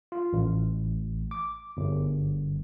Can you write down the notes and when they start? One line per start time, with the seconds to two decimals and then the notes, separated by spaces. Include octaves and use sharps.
0.12 F4
0.33 A1
1.31 D6
1.77 G1